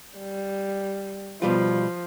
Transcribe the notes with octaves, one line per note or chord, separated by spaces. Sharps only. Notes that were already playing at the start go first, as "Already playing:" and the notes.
G3
B2 F3 G3 F4